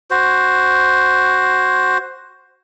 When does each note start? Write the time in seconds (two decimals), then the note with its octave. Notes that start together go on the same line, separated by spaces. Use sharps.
0.11 F#4 C5